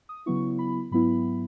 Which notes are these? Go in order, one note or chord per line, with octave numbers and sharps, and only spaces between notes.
D#6
C#3 F#3 B3 E4 C#6
B5
G#2 F#3 B3 E4 B5